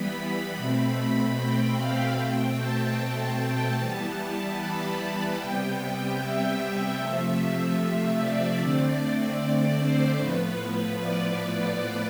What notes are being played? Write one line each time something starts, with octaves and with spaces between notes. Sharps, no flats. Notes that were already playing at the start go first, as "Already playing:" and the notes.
Already playing: E3 G3 B3 B5
B2 A3 C4
G5
F5
B2 A3 C4 G5
A5
E3 G3 B3
B5
A5
C3 G3 B3 G5
E5
C3 F3 A3
D5
D3 A3 C4
D5
C5
A2 F3 B3 B4
D5